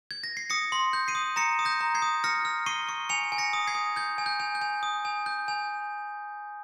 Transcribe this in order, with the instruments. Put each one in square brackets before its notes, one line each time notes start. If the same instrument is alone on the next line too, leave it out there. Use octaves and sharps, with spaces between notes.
[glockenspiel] G#6
A#6
C7
D#6 A#6 C#7
C6
G6
C7 D#7
D#6
A#5 A#6 C#7
D#6
G6 A#6
A#5
G#6 C7
D#6
F6 A#6 C#7
F6
C#6 C7 D#7
C#6
G#5 C#7 F7
G#5
A#6 C#7
D#6
G#6 C7
D#6
G6 G#6
G#5
G6
G#5
G6
G#5
D#6
G#5
G6
G#5